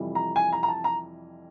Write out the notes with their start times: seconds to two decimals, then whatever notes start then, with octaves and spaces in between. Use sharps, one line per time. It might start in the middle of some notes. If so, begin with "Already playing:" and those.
Already playing: F2 C3 E3 G3
0.15 A#5
0.36 G#5
0.52 A#5
0.63 A#5
0.68 A5
0.84 A#5